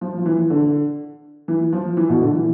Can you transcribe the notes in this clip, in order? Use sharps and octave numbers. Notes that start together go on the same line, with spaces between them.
F3
F3
E3
D3
E3
F3
E3
B2
D3
E3